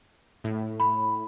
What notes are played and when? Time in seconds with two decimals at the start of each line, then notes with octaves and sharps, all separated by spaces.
0.44 A2
0.80 B5